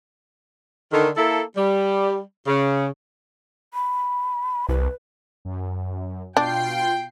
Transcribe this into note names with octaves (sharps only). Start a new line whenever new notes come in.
D3 D#3
A#3 E4 A4
G3
C#3
B5
C2 B4
F#2
B2 D4 F4 G5 C7